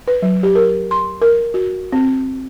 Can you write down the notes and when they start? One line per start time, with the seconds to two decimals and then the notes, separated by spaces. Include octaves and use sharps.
0.08 B4
0.22 F#3
0.43 G4
0.55 A#4
0.91 C6
1.22 A#4
1.54 F#4
1.92 C4